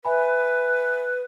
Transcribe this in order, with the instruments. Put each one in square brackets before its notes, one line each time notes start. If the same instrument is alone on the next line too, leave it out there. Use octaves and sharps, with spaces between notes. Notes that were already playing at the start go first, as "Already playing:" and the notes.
[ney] B4 [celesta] E5 G#5 B5